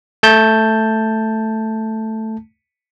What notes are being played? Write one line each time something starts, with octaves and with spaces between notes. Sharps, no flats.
A3 A5 G6